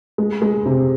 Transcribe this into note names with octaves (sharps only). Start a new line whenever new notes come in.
G#3
G#3
C3